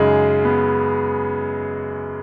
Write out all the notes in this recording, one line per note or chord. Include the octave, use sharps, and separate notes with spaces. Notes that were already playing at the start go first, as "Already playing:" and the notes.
Already playing: F#2 C#3 G#3 D#4
B3